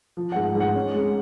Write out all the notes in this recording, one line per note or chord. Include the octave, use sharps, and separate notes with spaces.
F3
G#2 F#5
G#2
F#5
C#4
G#3